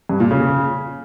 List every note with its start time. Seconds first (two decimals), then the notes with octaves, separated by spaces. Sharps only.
0.09 G2
0.20 A#2
0.31 C#3